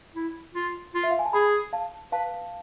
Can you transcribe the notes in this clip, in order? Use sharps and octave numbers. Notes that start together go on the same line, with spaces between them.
E4
F4
F4
E5
F5
G#5
A5
G#4 G#5 B5
F5 A5
B4 F5 A5